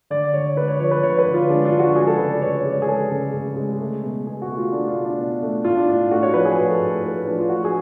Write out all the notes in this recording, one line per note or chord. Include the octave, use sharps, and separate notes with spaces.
D3 D5
D3 C#5
G#3 B4
C#5
F3 C#5
B4
D3 C#5
B4
D3
F4
G#3 D4
F4
F3
F#4
G#3 G#4
A4
C#3 B4
D5
C#3 C#5
D5
G#3
C#5
G#4
G#3 A4
C#3
C#3
G#3
A3
B2
B2 G#4
F#4
A3
F4
A3 D4
F4
B2
D4
B2
A3
A2 F4
D4
A2 F4
A3 F#4
C#5
F3 B4
G#4
A2 F#4
A4
A2
A3 B4
F3 D4
F4
A3 F#4
G#4